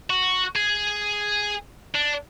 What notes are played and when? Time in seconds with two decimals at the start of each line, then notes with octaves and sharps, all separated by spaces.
0.10 F#4
0.56 G#4
1.95 D4